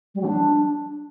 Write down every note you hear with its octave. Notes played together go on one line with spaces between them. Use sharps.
G3
F#3
D4